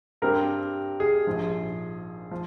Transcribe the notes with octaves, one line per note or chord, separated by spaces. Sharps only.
G2 G3 C4 A#4
G#4
A#1 G#2 F3
F3